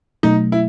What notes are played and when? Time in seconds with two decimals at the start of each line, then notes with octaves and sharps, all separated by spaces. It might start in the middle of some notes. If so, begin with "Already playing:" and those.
0.23 B2 F#3 A3 D#4
0.52 E4